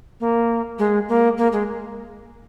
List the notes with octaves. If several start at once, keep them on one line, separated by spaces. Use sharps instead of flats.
A#3
G#3
A#3
A#3
G#3